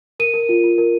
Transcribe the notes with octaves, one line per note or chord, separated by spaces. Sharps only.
A#4 D#7
A#4
F4
F4
A#4